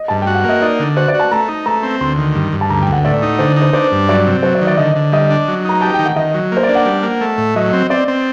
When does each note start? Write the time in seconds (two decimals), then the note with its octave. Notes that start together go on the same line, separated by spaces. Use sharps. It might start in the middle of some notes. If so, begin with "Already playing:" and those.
Already playing: D#5
0.08 G2 A5
0.22 G5
0.27 F#4
0.35 F#5
0.44 A#3
0.49 D#5
0.62 D#4 D5
0.80 D3
0.97 F#4 C5
1.08 D5
1.14 F#4
1.20 A5
1.31 A3 A#5
1.48 D#4
1.66 A3 A#5
1.83 C4
2.01 D2 C6
2.18 D#3
2.35 G2
2.52 G2
2.61 A5
2.70 D2 A#5
2.82 G5
2.87 D2
2.93 F#5
3.05 A2 D5
3.23 D#4
3.39 D3 C5
3.56 D#4
3.62 C5
3.73 D4 C5
3.92 G2
4.09 F#3 D5
4.27 C3
4.43 F#3 C5
4.55 D5
4.61 D#3
4.67 D5
4.77 D3 D#5
4.96 D3
5.12 G3 D#5
5.30 D4
5.48 F#3
5.65 D#4 A#5
5.81 G4 A5
5.94 G5
5.99 D#3
6.06 F#5
6.16 D#3 D#5
6.34 F#3
6.52 A#3 C5
6.63 D5
6.69 D4
6.75 F#5
6.86 G3
7.03 A#3
7.21 A3
7.38 A2
7.56 F#3 D#5
7.73 C4
7.90 C4 D5
8.08 C4